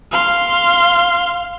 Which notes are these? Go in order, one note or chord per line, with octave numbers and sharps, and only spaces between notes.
F5 C6